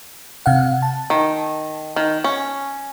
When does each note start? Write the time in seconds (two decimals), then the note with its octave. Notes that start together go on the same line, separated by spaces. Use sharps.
0.46 C3 F5 F#5
0.82 A5
1.10 D#3
1.96 D#3
2.24 C#4